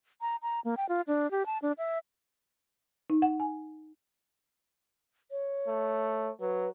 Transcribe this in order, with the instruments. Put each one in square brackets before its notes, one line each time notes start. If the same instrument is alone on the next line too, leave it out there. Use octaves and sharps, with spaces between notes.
[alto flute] A#5
A#5
A#3
G5
F4
D4
G4
A5
D4
E5
[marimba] D#4
F#5
G#5
[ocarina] C#5
[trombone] A3
[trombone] F#3 [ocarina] B4